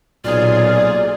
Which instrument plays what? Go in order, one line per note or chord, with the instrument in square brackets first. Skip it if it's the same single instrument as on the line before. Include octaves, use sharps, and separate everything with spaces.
[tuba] B1 [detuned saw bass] A#2 [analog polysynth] F4 G#4 [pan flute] D5